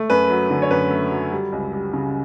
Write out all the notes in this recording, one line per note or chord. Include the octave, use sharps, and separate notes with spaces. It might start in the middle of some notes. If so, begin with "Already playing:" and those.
Already playing: A3
F#2 B4
F#3
D3
C#5
F#2 B4
A3
F#3
G3
C#2
G3
C#3